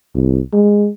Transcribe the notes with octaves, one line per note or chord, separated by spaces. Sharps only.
C2
G#3